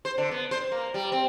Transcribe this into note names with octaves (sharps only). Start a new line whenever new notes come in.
C5
D3
B3
C5
A#3
G3
C4